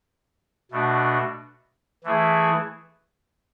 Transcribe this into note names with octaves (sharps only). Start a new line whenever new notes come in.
B2 A3 D4 F#4
E3 A3 E4 G#4